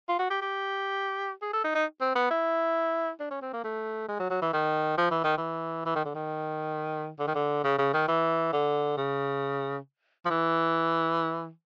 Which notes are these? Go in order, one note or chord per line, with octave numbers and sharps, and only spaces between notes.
F4
F#4
G4
G4
G#4
A4
D#4
D#4
C4
B3
E4
D4
C#4
C4
A#3
A3
G#3
F#3
F#3
E3
D#3
F3
E3
D#3
E3
E3
D#3
D3
D#3
D3
D#3
D3
C#3
C#3
D#3
E3
D3
C#3
F3
E3